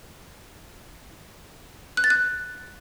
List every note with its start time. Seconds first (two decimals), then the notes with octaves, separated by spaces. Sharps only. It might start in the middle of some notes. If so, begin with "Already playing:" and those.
1.97 F#6
2.04 A6
2.10 F#6